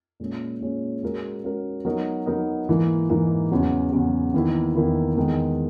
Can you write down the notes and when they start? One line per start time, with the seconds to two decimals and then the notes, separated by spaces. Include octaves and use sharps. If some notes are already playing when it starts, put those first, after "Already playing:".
0.20 A#2 G#3 C#4
0.61 A#2 G#3 C#4
1.03 G#3 C#4 F#4 A#4
1.44 G#3 C#4 F#4 A#4
1.85 F#3 B3 D#4 A#4 D#5
2.26 F#3 B3 D#4 A#4 D#5
2.68 G#2 E3 A#3
3.10 G#2 E3 A#3
3.52 E2 C#3 F#3
3.93 E2 C#3 F#3
4.34 E2 D#3 A#3 E4
4.75 E2 D#3 A#3 E4
5.16 E2 D#3 G#3